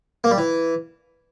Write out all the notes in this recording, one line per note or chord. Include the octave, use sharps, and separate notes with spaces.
A#3
G3
E3